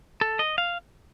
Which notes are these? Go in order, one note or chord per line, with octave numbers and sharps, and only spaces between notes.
A4
D#5
F5